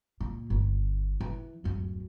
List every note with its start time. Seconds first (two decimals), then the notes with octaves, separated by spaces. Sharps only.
0.21 A#2
0.50 G1
1.21 E3
1.64 D1 F#2